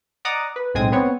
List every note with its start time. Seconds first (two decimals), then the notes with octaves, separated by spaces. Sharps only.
0.25 D5 D#5 F#5 A#5 D6 D#6
0.56 B4
0.74 B1 A2 G#3 C4 G#5 D#6
0.92 B3 C4 B4 C#5